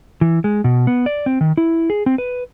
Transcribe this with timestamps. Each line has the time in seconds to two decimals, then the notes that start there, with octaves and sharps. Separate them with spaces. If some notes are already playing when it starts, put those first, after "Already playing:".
0.21 E3
0.44 G#3
0.64 B2
0.87 B3
1.06 D5
1.26 C4
1.41 D#3
1.58 E4
1.90 G#4
2.06 C4
2.18 B4